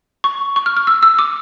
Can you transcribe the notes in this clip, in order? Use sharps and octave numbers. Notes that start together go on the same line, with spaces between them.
C#6
C#6
F6
F6
E6
E6
D6